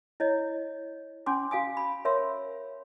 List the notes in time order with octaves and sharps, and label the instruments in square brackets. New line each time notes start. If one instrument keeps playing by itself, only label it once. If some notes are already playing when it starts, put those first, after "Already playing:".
[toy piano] E4 C#5 D#5
C#4 G#5 C6 D6
F#4 F5 G#5 D#6
B5
A#4 C#5 E5 C6